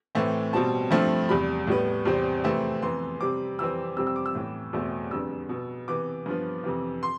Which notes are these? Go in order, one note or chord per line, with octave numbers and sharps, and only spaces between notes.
A2 E3 A3 C4
B2 G3 C4 A5
G2 F3 A3 C4
E2 C3 G3 B5
A2 G3 B3
E2 C3 G3 C4
F2 C3 E3 A3 C4
F2 E3 B3 C6
C3 G3 C4 D6
F2 E3 G3 C4 E6
F2 C3 G3 C4 E6
E6
D6
E6
A2 E3 B3
E2 B2 A3 C4
F2 D3 G3 B3 E6
B2 B3
C3 E3 B3 D6
G2 F3 B3
F2 C3 E3
C6